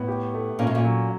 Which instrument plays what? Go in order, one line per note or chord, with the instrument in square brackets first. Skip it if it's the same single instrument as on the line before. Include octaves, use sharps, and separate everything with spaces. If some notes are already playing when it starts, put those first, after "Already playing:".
Already playing: [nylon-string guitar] A2 [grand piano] B3
[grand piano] G4
A3
[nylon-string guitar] A#2 [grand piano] C#4
[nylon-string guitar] A2
A#2
[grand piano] F#3